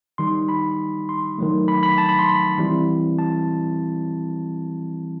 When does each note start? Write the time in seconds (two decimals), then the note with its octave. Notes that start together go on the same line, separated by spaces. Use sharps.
0.18 D#3 G3 D#4 C6
0.49 B5
1.09 C6
1.38 D#3 F#3 A3
1.68 B5
1.83 B5
1.98 A5
2.09 B5
2.19 C6
2.29 B5
2.58 E3 G3 C4 E4
3.18 A5